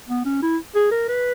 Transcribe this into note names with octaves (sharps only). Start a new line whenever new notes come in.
B3
C#4
E4
G#4
A#4
B4